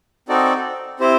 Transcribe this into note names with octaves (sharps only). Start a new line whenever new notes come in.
C4 D#4 F#4 A4 D5
C4 E4 G4 C5